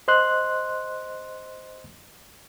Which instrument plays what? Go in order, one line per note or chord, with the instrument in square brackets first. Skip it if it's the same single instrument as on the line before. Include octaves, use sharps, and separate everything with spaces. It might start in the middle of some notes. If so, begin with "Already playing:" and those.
[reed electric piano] C5 D#5 C6 F#6